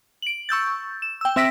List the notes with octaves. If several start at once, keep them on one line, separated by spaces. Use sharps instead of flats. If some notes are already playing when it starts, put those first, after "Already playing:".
D7 F#7
C#6 E6 G6 A6
E7
G5 E6
C4 E5 E6 A#6 B6 D7